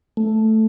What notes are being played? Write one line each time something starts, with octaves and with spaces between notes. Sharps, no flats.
A3